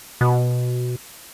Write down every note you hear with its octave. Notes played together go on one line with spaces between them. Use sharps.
B2